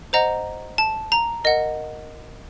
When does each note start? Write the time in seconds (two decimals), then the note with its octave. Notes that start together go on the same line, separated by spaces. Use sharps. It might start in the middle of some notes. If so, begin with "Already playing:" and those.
0.13 C5 D#5 F#5 A#5
0.78 A5
1.12 A#5
1.44 A#4 D#5 F#5